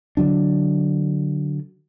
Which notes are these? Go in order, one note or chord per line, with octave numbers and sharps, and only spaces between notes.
D3 F#3 D4